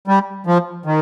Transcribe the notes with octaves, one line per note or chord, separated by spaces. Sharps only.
G3
F3
D#3